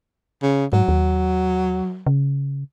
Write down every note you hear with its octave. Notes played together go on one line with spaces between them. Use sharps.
C#3
G#2 F#3
D#2
C#3